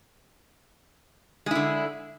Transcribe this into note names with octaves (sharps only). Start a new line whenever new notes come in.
D3 G#3 E4